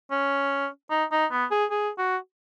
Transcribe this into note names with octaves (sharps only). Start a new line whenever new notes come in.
C#4
D#4
D#4
B3
G#4
G#4
F#4